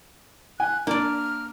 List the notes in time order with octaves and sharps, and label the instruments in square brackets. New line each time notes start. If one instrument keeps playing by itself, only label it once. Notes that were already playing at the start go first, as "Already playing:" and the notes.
[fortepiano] G#5 [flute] F#6
[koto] A#3 D5 [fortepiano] D4 [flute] F6